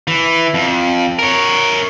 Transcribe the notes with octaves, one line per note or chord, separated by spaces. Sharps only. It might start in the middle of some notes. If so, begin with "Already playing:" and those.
E3
F2
A#4 C#5